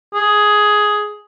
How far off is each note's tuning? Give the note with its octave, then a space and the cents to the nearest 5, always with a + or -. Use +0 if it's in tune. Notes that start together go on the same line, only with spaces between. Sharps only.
G#4 +10